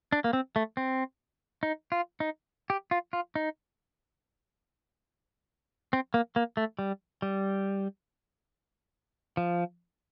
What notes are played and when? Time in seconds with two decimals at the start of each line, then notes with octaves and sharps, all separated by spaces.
0.12 D4
0.24 A#3
0.33 C4
0.56 A3
0.77 C4
1.63 D#4
1.92 F4
2.20 D#4
2.70 G4
2.91 F4
3.13 F4
3.35 D#4
5.93 C4
6.14 A#3
6.36 A#3
6.57 A3
6.79 G3
7.22 G3
9.37 F3